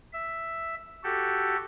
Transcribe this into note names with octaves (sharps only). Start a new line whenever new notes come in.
E5
F#4 G4 A4